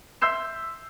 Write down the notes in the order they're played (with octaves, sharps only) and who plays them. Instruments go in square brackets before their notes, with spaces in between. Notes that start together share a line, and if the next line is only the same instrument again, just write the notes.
[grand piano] E5 C6 E6 G6 C7 E7